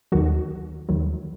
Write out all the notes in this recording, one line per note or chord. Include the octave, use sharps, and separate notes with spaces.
D#2 D#3 F#3 F#4
D#2 D#3 F#3